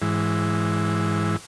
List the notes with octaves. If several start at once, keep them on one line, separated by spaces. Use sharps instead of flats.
G#2 E3